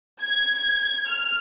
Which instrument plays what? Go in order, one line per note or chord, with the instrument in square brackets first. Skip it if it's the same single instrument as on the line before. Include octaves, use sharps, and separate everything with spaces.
[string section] G#6
F6